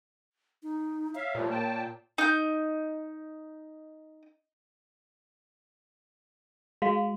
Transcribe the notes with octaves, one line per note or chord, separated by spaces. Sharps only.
D#4
C#5 E5 F5
A#2 F3 G3 A3
G5 A5
D#4 G6
G#3 F#4 F5